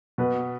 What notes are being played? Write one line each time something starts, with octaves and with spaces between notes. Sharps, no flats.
B2 B4